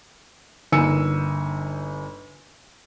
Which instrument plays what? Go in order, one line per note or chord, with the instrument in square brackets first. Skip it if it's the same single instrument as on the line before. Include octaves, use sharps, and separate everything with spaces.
[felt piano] G1 A#3 D#4 G#5 E6 C#7